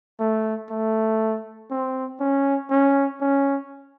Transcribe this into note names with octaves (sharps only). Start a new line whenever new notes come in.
A3
A3
C4
C#4
C#4
C#4